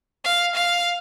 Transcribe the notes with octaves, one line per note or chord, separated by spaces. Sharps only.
F5
F5